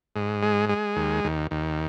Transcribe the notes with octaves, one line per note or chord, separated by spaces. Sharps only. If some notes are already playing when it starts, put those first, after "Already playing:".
G#2
G#3
G#3
D#2
D#2
D#2